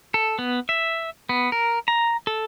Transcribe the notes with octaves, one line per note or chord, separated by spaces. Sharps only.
A4
B3
E5
B3
A#4
A#5
A4